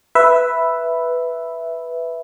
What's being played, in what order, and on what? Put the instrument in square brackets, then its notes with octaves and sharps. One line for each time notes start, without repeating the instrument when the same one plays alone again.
[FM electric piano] B4 E5